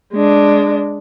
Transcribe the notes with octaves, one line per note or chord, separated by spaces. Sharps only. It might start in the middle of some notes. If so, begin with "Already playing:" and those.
G#3 D4